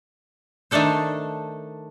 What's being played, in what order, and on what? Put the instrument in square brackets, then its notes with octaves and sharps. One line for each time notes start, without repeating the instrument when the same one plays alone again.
[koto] D#3 A3 D4 A4 C5